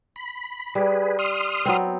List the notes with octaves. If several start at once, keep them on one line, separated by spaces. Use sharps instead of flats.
B5
G3 G#4 B4
C6 D#6 F6
F#3 B3 C4